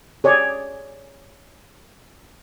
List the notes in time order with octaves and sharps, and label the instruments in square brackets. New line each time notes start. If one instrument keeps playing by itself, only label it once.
[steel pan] G#4 C#5 D5